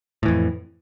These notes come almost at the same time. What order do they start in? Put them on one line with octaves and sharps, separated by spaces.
A2 E3 F2